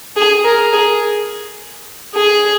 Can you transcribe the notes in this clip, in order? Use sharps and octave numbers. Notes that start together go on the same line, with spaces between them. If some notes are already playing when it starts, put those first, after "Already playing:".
G#4
A#4
G#4
G#4